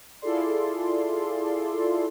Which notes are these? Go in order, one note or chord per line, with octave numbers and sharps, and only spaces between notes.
E4 F4 G#4 A4 D5 C6